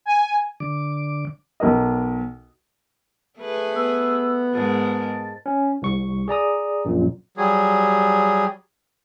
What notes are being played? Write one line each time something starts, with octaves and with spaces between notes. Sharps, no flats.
G#5
D3 D6
B1 A#4 D#5
A3 G#4 B4
B3 E6
G#2 G#3 A#4 A5
C#4
C2 C#6
G#4 D5 A#5 D#6
A#1 F#2 A#2
F#3 G3 G#4